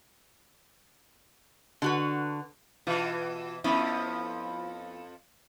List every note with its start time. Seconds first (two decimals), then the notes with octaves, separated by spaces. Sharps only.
1.82 D3 F#4 B4
2.87 B2 E3 F4
3.64 F2 F3 B3 C#4 E4